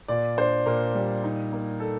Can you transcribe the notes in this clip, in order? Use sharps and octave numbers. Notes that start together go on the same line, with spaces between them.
A#2 D5
D4 C5
A#2 A#4
G3
D#4
A#3
A4